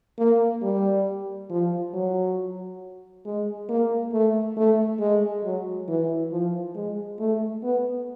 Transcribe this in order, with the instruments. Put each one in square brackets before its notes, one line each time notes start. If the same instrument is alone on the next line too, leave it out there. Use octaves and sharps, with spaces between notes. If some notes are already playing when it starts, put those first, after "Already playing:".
[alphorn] A#3
G3
F3
F#3
G#3
A#3
A3
A3
G#3
F#3
E3
F3
G#3
A3
B3